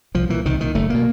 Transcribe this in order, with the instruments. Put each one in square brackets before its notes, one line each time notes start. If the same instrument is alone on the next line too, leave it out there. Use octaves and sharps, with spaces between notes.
[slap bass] C2 F3
A#2 E3
C2 D#3
A#2 D#3
F#1 A3
B2 A#3